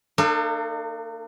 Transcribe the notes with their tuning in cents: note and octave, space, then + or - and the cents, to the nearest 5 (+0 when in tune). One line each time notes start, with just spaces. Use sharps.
A#3 -35 D4 +45 A4 +10